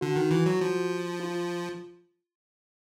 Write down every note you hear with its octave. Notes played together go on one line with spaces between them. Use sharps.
D3 F#4
D#3
E3
F#3
F3
F4